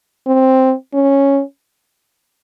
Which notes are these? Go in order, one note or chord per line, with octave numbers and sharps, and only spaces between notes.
C4
C#4